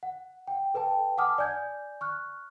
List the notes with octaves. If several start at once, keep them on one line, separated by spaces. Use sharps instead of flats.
F#5
F#5 G5
A4 B4 G5 A5
F#5 G#5 A5 D6 D#6 F6
D5 G#5 G6 G#6
C#6 F6 F#6